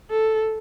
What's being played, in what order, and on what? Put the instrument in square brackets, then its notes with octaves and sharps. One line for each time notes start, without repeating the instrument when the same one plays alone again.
[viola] A4